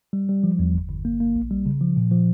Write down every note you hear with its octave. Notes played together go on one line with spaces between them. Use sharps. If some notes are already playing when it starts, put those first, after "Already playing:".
G3
G3
F3
E2
G1
G1
A#3
A#3
A#1
G3
C#3
F3
A#2
F3